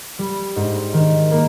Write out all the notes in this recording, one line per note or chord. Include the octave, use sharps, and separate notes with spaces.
G3
G#2
D#3
A#3